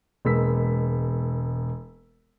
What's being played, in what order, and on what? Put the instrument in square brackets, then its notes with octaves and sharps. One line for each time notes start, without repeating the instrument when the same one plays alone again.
[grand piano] E1 G#3 A#3 E6 B6